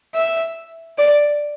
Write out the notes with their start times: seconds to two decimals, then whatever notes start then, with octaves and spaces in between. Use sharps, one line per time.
0.14 E5
0.98 D5